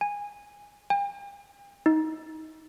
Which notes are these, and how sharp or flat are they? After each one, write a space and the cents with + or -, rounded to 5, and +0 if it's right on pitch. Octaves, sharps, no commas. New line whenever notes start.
G#5 -15
G5 +45
D#4 +20